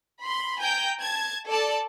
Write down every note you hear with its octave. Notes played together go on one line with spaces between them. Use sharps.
B5 C6
G5 G#5 A#5 G6
A5 G#6
A4 D5 A5